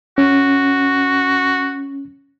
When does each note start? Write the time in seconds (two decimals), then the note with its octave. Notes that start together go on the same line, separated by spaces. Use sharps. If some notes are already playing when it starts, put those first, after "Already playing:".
0.18 C#4 F#4